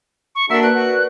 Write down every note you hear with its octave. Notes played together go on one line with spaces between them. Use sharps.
C#6
A#3 D4 F#4 A4 A#4 E5
B4 D5 F#6
F#4